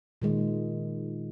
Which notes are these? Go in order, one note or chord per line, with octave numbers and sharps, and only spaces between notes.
A#2 D#3 G#3